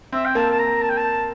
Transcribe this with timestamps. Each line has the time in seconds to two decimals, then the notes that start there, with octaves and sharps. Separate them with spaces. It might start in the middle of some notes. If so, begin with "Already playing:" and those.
0.12 C4 E5
0.25 G5
0.35 A#3 A5
0.51 A5
0.59 A#5
0.81 A5
0.89 G5
0.97 A5